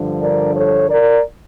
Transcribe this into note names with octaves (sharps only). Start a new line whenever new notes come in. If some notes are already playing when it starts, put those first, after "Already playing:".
Already playing: G2 D3 F3
A#4 D5
A4 C#5
A#4 D5